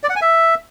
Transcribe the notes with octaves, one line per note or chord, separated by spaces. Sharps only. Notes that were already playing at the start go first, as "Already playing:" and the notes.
D5
F#5
G#5
E5